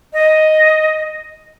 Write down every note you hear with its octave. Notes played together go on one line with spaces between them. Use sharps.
D#5